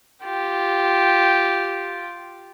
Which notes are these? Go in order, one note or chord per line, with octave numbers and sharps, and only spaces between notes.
F4 G4